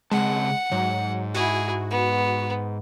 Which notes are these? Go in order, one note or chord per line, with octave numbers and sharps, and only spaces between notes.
C#3 G#3 C4 F#5 A5
G#2 F#3
E4 F#4 G#4
B3